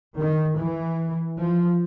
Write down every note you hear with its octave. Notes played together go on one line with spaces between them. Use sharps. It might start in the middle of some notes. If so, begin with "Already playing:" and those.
D#3
E3
F3